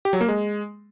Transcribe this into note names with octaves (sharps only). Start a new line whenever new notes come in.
G4
F#3
A#3
G#3